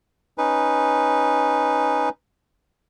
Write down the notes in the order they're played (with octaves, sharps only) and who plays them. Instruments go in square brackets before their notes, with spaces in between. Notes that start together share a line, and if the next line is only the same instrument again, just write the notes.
[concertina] C#4 D#4 B4